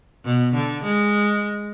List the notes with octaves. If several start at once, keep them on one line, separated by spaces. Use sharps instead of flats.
B2
D3
G#3